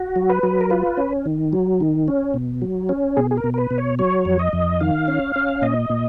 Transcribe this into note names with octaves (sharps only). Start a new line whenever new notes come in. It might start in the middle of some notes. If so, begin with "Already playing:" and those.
Already playing: F#4
F#3
B4
F#3
A#4
F4 B4
C#4
D#3
F#3
D#3
C#4
B2
F#3
C#4
B2 G#4
G#4
A#4
B2
A#4
B4
B2
C#5
F#3 C#5
F2
D#5
F2
D#3 F5
C#4
C#4
A#2 D#5
A#2